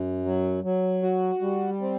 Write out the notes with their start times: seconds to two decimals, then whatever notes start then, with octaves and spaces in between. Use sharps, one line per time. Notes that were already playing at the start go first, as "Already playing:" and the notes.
Already playing: F#2
0.25 F#3
0.64 F#3
1.03 F#4
1.41 G3
1.81 C4